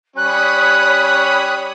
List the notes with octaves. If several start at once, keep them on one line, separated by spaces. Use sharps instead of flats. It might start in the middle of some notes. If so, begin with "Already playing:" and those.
G3 C#4 C#5 B5 D#6 F#6